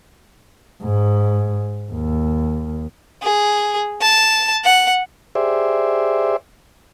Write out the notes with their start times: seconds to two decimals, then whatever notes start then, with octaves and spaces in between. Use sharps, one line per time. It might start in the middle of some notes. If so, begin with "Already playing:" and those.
0.82 G#2
1.92 D#2
3.22 G#4
4.01 A5
4.65 F#5
5.35 G4 G#4 C5 D5 E5